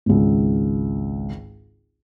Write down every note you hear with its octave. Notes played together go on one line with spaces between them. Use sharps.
G#1 C#2